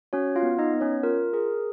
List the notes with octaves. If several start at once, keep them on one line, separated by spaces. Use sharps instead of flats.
C#4 F#4 C#5
F4 F5
B3
D#4 D#5
B3
C#4 C#5
F4 A#4
G#4 A#4